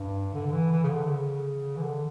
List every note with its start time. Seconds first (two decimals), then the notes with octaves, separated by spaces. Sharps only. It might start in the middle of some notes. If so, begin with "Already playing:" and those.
Already playing: G2
0.34 D3
0.46 D3
0.52 E3
0.71 E3
0.83 C#3
0.90 D3
1.08 C#3
1.77 E3
1.82 D3